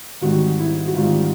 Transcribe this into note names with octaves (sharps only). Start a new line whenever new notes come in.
G#2 D#3 G3 C4 F#4
E4
F#4
G#2 D#3 G3 C4 F4